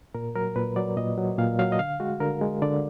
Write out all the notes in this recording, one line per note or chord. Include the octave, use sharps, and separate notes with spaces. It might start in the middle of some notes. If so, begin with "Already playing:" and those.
A#2 A#4
F#3 A#4
A#2 B4
F#3 D5
A#2 D#5
F#3
A#2 F5
F#3 F5
D#5
D3 F5
G#3 F#4
D3 A#4
G#3
D3 D5